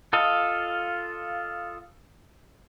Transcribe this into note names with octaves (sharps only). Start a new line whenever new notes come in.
F4 A4 D#5 F5